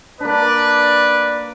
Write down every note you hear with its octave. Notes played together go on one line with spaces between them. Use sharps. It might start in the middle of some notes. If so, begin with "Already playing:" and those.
A#3 D4 B4 D5